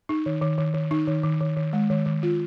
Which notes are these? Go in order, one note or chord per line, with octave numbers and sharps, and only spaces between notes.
D#4
D#3
D#3
D#3
D#3
D#4
D#3
D#3
D#3
D#3
G#3
D#3
D#3
F4